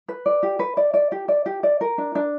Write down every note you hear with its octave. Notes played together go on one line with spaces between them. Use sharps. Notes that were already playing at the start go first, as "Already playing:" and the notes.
B4
D5
G4
B4
D5
D5
G4
D5
G4
D5
A#4
D4
D4